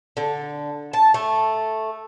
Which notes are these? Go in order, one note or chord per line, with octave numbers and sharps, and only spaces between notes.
D3
A5
A3